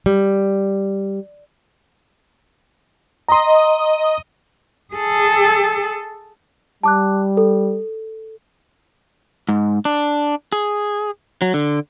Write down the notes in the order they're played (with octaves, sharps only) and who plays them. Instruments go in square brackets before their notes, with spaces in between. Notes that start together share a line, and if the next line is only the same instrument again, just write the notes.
[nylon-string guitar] G3
[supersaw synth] D#5 [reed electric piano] A#5 C6
[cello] G#4 A4
[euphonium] G3 [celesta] A5 D6 F#6
[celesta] A4
[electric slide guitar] G#2
D4
G#4
F#3
D3